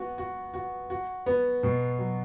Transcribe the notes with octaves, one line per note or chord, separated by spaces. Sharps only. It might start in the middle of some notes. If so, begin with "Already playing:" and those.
Already playing: B3 F#4
F#4
F#4
F#4
B3
B2
F#3